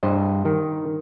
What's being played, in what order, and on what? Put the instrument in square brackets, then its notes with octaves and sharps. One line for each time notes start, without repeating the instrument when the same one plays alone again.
[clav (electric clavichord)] G2 C5 D#5
D#3